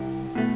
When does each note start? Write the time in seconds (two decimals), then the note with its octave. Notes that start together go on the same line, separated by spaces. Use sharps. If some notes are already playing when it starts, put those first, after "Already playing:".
Already playing: C2 E4 G4
0.35 B2 A3